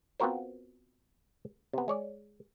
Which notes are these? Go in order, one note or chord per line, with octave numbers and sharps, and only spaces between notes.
B3 C4 F4 F#4 A#4 C5
C3 B3
G#3 C#5 D5